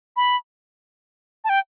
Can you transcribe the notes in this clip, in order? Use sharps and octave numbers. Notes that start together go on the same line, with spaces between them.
B5
A5
G5